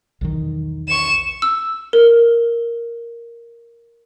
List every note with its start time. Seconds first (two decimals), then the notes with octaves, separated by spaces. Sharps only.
0.21 B1 E2 D#3
0.89 C#6 E7
1.42 E6
1.93 A#4